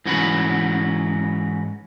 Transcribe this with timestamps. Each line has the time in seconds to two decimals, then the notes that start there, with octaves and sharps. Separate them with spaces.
0.06 G#2 E3 C#4 F#4 G#4 B4